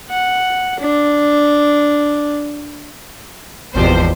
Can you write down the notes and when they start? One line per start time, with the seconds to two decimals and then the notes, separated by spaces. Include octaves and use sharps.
0.11 F#5
0.80 D4
3.75 G#1 E2 B2 F3 G4 C5